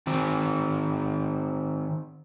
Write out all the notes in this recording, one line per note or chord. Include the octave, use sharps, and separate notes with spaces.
D#3 C4